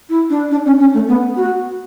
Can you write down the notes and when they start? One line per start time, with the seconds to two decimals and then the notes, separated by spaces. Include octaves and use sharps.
0.09 E4
0.30 D4
0.51 D4
0.66 C#4
0.79 C#4
0.94 A3
1.08 B3
1.36 F#4